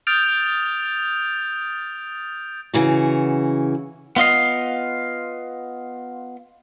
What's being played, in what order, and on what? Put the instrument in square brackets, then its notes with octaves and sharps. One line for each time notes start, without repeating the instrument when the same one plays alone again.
[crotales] D#6 F6 G6 A6 D7 F7
[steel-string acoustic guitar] C#3 E3 F#4
[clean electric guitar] B3 F4 D#5 F5